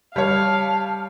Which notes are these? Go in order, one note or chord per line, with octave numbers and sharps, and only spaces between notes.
G3 C#5 F5 A5